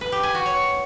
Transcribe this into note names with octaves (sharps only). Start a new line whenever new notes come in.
B4
G4
G#5
F#4
C#5